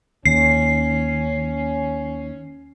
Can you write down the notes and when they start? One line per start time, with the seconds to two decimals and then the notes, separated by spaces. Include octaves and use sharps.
0.25 D#2 C#4 C7